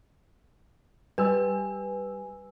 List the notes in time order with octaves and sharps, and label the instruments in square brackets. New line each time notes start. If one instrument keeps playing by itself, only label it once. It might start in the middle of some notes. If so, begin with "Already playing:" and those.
[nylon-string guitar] G3 [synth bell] B4 G#5 E6